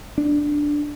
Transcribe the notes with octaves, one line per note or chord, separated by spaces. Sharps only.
D4